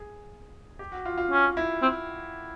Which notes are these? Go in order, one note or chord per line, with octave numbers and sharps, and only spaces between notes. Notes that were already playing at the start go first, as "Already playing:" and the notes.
Already playing: G#4
G4
F#4
F4
F4
C#4
E4
C4